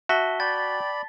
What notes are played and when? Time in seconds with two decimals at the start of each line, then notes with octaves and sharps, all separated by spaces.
0.09 F#4 E5 A5 B6 G7
0.40 D5 G5 B5 A6